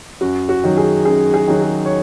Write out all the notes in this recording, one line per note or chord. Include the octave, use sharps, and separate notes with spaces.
F#2 F#4
F#4
D#3 F#3
G#4
F#2 G#4
G#4
D#3 F#3
G#4
C#5